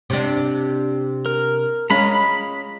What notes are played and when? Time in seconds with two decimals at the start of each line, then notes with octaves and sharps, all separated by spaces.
0.10 C3 D4
1.26 A#4
1.90 G#3 C#4 F4 A#5 B5